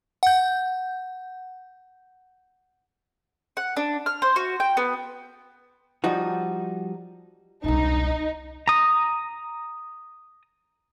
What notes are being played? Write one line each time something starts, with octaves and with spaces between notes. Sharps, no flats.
F#5 G6
F#5
D4
F6
C5
F#4
G5
B3
F3 G3 D#4 F#4
E1 C2 D#4
A#5 D#6